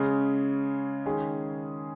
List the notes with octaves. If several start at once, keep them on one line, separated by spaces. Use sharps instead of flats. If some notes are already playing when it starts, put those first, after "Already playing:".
Already playing: C#3 G#3 C#4
D#3 G#3 C#4 G#4